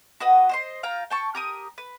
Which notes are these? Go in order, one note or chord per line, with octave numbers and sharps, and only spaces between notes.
F#4 B4 D#5 F#5
C5 D#5 C6
F4 F5 G5 A#5
G5 A5 C#6
G4 A#4 D#6
B4